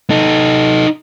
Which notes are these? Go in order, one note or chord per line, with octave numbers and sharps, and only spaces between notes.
D#4 A4